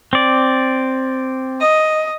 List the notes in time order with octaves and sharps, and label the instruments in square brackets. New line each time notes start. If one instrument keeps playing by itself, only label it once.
[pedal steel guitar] C4 D5
[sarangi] D#5